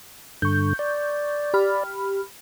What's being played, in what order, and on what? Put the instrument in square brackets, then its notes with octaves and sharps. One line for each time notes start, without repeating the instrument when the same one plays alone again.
[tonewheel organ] G2 D3 [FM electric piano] C#6 G6
[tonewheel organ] D5
[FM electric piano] G4 B5 F6